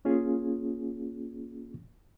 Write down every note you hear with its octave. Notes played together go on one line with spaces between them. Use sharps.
A#3 C#4 F4 G#4